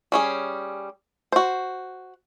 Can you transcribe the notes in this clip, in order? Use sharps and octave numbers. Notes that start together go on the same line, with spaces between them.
G3 C#4 G#4
F#4 C5